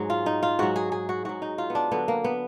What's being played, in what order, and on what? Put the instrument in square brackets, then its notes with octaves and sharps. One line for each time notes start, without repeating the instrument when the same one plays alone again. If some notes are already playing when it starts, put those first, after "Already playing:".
Already playing: [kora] G#2 F#3 G#4
F4
D#4
F4
G#2 F#3 F#4
G#4
G#4
F#4
G#2 F#3 F#4
D#4
F4
B3
D4
D3 F#3 B3
A#3
B3